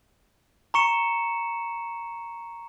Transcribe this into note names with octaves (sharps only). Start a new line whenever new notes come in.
A#5 C#6 C#7 E7